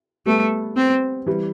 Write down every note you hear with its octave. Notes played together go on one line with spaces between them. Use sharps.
G3 A3 B3
C4
E3 G3